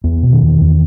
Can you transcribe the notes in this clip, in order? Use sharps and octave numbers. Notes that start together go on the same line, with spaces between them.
E2 B3
B2
D#3
E2
E2